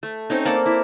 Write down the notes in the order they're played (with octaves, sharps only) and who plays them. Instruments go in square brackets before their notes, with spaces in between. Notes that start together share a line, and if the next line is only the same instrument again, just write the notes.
[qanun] A3
C4 C#4 D#4
A#3 A4 D5
E4